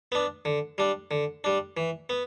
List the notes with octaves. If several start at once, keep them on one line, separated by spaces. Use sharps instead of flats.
B3 D4
D3
G3 D4
D3
G3 D4
E3
B3